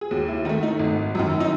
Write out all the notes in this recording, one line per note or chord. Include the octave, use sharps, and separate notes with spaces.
G#4
D#2 F#4
E4
D#3 A3 D#4
D#4
G#1
F#2 D#3
D#4